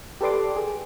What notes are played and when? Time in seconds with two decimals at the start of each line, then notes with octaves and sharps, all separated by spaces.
0.21 G4 A4 B4 D5 C6 D6
0.56 G#4